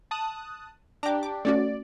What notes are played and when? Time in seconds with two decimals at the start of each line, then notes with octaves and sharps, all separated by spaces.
0.11 A5 D#6 F#6
1.03 D4 G4 A#5 D6
1.23 D6
1.45 A3 C#4 F#4 D5